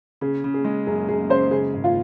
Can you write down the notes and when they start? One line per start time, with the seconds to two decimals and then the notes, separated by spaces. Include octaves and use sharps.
0.21 C#3 G#4
0.44 C#3
0.54 G#4
0.64 G#3
0.87 F#2 G#4
1.09 F#2 G#4
1.30 C#3 C5
1.51 C#3 G#4
1.74 G#1
1.84 F4